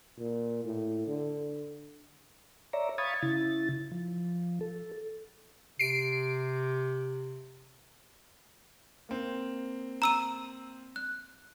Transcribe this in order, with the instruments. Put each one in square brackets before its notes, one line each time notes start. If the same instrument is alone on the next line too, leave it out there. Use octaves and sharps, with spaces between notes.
[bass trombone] A#2
A2
D3
[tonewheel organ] C#5 D5 E5 A#5
F5 B5 C#6 D#6 G#6 A6
C#3 E4 A6
F3
A4
[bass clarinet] C3 [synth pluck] C7 D7
[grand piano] A#3 C4
[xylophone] A#5 E6 D#7
F#6